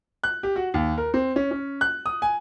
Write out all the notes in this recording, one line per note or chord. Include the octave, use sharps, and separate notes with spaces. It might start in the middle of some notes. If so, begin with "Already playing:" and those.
F#6
G4
F#4
D#2
A#4
C4
C#4
C#4
F#6
D#6
G#5